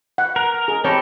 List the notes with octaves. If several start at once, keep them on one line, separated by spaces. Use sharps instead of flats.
F#5
A#4
G#4
C4 G4 A4 C#5 A#5 B5